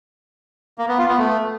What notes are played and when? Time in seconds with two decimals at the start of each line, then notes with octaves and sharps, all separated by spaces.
0.78 A#3
0.88 B3
0.98 F4
1.08 B3
1.18 A3